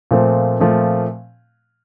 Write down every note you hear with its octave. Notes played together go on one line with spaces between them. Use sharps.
A#2 F3 A3 C4
A#2 F3 A3 C4